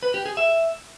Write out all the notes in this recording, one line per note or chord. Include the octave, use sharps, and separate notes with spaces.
B4
G4
G#4
E5